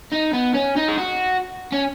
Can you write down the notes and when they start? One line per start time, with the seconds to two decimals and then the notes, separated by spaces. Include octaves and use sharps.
0.12 D#4
0.34 B3
0.54 C#4
0.76 D#4
0.88 G#4
0.98 F#4
1.72 C#4